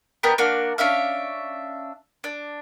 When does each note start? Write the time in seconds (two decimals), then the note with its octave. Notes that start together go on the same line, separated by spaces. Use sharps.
0.23 B3 D4 G4 A#4
0.38 A#3 D4 F#4
0.78 C#4 D4 E5 F5
2.24 D4